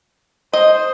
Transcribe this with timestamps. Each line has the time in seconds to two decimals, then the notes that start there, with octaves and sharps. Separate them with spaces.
0.53 C5 D#5